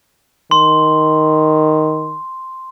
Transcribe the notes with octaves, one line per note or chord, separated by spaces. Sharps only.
D#3 C6